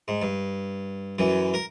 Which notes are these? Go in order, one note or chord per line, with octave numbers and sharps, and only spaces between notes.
G#2
G2
F#2 E3
A#4